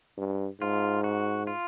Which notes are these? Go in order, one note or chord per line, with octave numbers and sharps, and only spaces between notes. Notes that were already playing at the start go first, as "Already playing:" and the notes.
G2
G#2 F4
F#4
F4